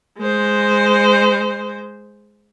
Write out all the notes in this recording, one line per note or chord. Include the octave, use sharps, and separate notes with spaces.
G#3 C5